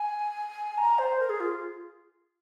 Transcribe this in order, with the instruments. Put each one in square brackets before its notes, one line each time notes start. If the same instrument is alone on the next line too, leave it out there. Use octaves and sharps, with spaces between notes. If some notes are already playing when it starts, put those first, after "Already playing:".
Already playing: [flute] G#5
A#5
C5
A#4
G#4
F4